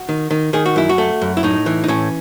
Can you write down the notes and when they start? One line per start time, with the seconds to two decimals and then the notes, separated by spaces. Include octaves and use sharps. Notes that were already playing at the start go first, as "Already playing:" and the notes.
Already playing: F#4
0.09 D#3
0.31 D#3
0.53 D#3 G#4
0.66 F#4
0.76 F#2 E4
0.89 F#4
0.98 A3
1.22 F#2
1.37 E4
1.43 A2 D#4
1.66 E3
1.84 D#4
1.88 A2 C#4